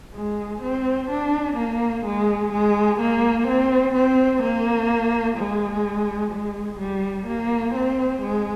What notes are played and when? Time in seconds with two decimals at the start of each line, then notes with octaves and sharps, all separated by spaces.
0.14 G#3
0.62 C4
1.10 D4
1.57 A#3
2.05 G#3
2.52 G#3
3.00 A#3
3.47 C4
3.95 C4
4.43 A#3
5.37 G#3
6.32 G#3
6.79 G3
7.27 A#3
7.74 C4
8.22 G#3